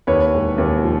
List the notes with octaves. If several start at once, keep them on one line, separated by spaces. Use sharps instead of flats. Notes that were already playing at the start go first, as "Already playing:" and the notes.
D#2 B4 C#5
E1
D#2
F3